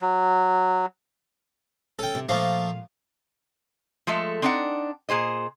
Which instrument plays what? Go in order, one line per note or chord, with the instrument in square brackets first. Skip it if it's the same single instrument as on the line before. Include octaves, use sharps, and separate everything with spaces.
[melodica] F#3
[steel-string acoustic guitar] C#4 [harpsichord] A4 G5
[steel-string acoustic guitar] C3
[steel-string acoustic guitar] A#2 F5 [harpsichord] F3 A3 A#3
[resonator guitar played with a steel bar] F3 G#3 A3 A4
C4 D4 D#4 D5 E5 F#5
A#2 G#4 C5 D#5